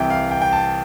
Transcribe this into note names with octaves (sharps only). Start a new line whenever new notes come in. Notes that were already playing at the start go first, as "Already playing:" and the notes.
Already playing: C2 C3 E3 G5
F5
G5
G5
A5